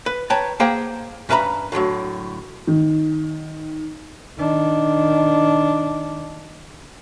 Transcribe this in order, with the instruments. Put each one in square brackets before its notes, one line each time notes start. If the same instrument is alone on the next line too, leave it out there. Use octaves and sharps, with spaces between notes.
[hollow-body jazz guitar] B4
B4 C#5 G5 A5 A#5
A#3 G#4 C5 F#5 G5 A#5
G2 C#4 B4 E5 A#5 B5
A2 D3 E3 F#3
[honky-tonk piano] D#3
[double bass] D#3 D4